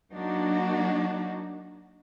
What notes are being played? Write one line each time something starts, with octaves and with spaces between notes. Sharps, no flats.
F#3 A#3 D4 D#4 F#4